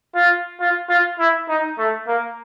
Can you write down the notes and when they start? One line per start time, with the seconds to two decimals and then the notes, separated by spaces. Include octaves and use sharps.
0.15 F4
0.60 F4
0.89 F4
1.19 E4
1.49 D#4
1.78 A3
2.07 A#3